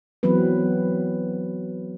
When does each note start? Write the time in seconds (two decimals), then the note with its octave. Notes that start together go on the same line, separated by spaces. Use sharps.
0.23 E3 F#3 B3 C4 B4